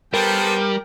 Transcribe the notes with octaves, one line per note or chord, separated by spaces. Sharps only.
G3 B3 A4 A#4 C5 G5